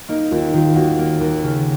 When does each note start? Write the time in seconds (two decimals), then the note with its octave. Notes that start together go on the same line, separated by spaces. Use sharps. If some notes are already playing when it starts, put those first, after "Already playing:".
0.09 A#3 D#4
0.31 D#2 F4
0.53 D#3 F4
0.67 F4
0.75 D#2 F#4
0.98 A#3
1.20 D#2
1.43 C#3